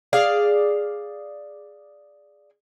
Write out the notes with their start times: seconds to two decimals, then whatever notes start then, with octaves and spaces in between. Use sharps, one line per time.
0.13 G#4 D5 F5